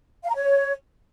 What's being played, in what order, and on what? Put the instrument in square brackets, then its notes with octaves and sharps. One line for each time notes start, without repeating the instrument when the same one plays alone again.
[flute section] F5
A#5
C#5